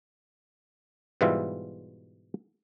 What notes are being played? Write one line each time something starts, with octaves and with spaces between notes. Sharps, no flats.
G#2 B2 E3 G3 F4 E5